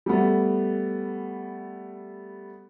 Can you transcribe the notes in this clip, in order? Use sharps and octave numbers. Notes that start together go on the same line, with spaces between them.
G3 A3 B3